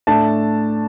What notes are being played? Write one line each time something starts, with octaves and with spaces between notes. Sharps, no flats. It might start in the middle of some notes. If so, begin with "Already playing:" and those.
A2 A3 D4 A5